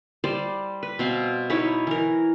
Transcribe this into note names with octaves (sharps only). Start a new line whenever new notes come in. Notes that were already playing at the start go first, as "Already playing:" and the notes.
G3 C5 D5
B4
B2 C4 F5
D#4 E4 B4 C#5
E3 A#4